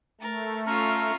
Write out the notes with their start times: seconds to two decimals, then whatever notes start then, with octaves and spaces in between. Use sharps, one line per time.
0.21 A3 A#4 A6
0.67 C#4 F4 E5 A#5 C#6 F6